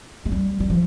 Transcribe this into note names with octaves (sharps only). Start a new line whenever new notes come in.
G#3
G3
G3
F3